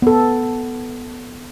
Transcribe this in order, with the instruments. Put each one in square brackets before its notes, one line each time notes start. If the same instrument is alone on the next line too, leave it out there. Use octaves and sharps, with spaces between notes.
[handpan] B3 A4